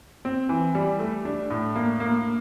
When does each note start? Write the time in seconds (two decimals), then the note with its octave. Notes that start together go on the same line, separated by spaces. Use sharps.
0.25 C4
0.49 E3
0.75 G3
0.99 A3
1.25 D4
1.50 A2
1.76 A#3
2.00 A#3